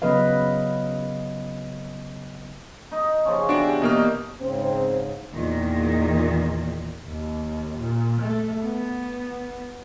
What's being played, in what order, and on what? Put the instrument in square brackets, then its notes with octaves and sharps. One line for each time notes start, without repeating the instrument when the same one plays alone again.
[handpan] C#3 F#3 B3 B4 D#5 F5
[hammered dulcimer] D#4 D#5
C#3 F3 C#4
[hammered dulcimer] B2 E3 G4 [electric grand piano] D4 F#4 D7
[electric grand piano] B2 A#3 F6 [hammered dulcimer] D#4 D5 D#5
[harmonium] G#2 C#3 [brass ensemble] C4
[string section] E2 A#2 D#3
[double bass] D#2
A#2
A3
B3